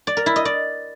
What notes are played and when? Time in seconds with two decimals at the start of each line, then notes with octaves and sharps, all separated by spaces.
0.07 D5
0.17 A#4
0.26 E4
0.36 D#5
0.45 D5